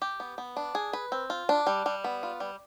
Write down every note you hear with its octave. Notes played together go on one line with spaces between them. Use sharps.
G4
B3
B3
D4
G#4
B4
C4
F4
D4
G3
G3
B3
F4
G3